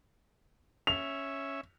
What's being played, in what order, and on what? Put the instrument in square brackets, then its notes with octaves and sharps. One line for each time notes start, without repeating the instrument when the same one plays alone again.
[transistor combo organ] C#4 E5 [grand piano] F7